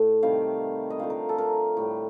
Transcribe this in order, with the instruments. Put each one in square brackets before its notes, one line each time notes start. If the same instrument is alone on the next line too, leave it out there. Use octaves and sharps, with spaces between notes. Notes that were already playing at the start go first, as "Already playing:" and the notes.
Already playing: [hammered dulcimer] A2 A3
C3 D#3 G3 F5
D#5
D3 F3 A3 F5
A#4
A4
A#4
A2 G3